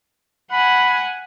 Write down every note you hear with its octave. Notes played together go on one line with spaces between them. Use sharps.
F#5 G#5 B5